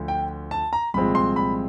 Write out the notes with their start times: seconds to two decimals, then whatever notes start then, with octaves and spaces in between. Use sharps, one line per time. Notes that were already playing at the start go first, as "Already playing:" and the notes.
Already playing: D2 D3 F3
0.08 G5
0.51 A5
0.73 A#5
0.94 C2 A#2 F3 G#3 C4 B5
1.15 C6
1.36 B5